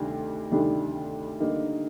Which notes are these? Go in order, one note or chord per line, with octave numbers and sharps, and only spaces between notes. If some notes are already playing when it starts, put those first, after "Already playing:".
Already playing: D2 C3 D#3 G3 D4
D2 C3 D#3 G3 D4
D3 G3 A#3 D#4